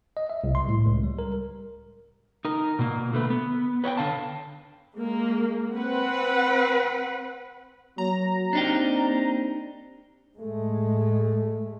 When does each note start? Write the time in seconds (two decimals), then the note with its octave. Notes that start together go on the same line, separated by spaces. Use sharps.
0.17 D#5
0.30 E5
0.44 C2
0.55 C6
0.68 A2
0.86 C#2
1.03 G3
1.19 A#4
2.45 D#4 A#4
2.79 B2 A#3
3.13 D3 A3 B4
3.30 B3
3.84 B4 C#5 F5 G5
3.97 D3 F5 A5
4.95 G#3 A#3
5.75 C4 B4 F#5
7.98 F#3 A#3 A#5
8.53 C4 D4 D#4 G4
10.38 A2 G#3 A3